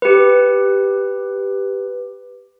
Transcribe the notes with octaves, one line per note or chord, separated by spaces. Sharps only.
G4 B4